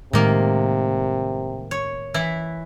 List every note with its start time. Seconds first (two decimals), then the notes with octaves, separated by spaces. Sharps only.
0.13 A2 C3 D#3 G#3 A#3
1.71 C#5
2.14 E3 E4